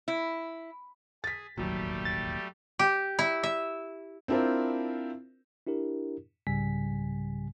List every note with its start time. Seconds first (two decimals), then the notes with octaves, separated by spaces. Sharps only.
0.08 E4
1.24 G#4 A6 B6
1.57 E1 A1 D#2 F#3 G3 A3 G4
2.05 A6
2.79 G4
3.19 E4
3.43 E5
4.28 C4 D4 E4 F4 A#4 C5
5.67 D4 E4 G4 A#4
6.47 C2 G#2 C#3 G3 G#5 B6